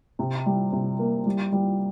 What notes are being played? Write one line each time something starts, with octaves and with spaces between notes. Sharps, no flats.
C3
G3
C3
A#3
G3
G3